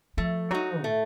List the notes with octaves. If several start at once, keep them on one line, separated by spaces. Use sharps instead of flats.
F3 A3
F#3 D#4 F#4
A2 A3